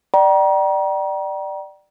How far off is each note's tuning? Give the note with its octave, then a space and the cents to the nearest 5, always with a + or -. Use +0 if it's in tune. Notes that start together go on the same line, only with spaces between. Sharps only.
D5 +15 G5 -35 A#5 +35